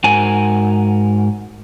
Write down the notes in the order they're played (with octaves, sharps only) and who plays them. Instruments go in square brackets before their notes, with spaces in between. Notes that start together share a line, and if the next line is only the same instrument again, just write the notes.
[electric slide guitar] G#2 F#4 A#4 G#5